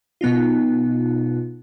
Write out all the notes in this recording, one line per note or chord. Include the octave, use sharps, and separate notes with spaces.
B2 B3 D#4 F4